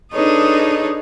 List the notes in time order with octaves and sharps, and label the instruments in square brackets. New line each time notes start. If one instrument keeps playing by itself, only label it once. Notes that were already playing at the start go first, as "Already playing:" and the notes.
[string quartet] D4 D#4 G#4 A4 B4 C#5